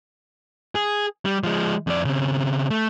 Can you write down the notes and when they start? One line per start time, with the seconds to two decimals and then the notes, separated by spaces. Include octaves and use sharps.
0.75 G#4
1.25 G3
1.44 F3 G#3
1.87 F2 D5
2.05 C#3 C4
2.70 A3